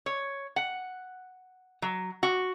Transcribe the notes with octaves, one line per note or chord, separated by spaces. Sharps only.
C#5
F#5
F#3
F#4